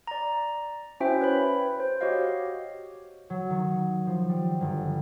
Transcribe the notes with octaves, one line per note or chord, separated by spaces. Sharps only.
D5 A#5
C#4 E4 F#4 C5 E5 G5
B4 C#5 B5
C5
F#4 G4 C#5 D#5 F5
F#3
D#3
F3
G3
G1